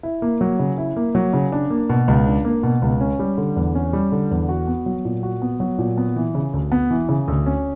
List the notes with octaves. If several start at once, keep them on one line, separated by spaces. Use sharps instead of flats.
E4
A#3
F#3
C#3
E4
A#3
F#3
C#3
D4
A#3
B2
C#2
D4
A#3
B2
C#2
C#4
G3
D3
E2
C#4
G3
D3
E2
F#4
B3
F#3
A#2
F#4
B3
F#3
A#2
B3
E3
C#3
D2
B3
E3
C#3
D2
C#4